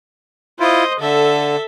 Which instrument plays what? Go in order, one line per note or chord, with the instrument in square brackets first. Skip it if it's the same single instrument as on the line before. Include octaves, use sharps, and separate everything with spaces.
[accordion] E4 F4 [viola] C5 D#5
[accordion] D3 [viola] A4 E5